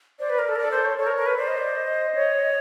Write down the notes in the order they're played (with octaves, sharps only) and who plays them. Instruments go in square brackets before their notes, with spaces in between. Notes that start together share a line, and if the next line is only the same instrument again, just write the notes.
[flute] C5 [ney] D5
[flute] B4
A#4
A4
A#4
[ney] D5
[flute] A4
[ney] C5
C#5
[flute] A4 [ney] C#5
[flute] A#4
A#4
B4
[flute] C5 [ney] D5
[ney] D#5
D5
D#5
[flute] C#5